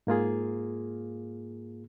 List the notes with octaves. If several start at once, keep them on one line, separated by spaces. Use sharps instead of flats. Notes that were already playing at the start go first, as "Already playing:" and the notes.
G#2 A#3 F4 G#4